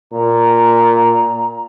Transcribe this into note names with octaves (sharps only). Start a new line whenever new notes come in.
A#2 A#5